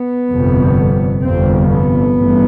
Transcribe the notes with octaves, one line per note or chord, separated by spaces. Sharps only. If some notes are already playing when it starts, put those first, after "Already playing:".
Already playing: B3
G1 F2 C3
G1 F2 C3 C4
B3
A1 G2